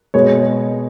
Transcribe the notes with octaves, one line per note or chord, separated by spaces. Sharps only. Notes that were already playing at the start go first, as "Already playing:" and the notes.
B2 G#3 B3 C#5